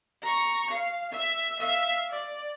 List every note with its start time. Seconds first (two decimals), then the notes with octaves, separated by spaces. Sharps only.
0.23 A#5 C#6
0.71 F5
1.13 E5
1.60 E5 F5
2.10 D5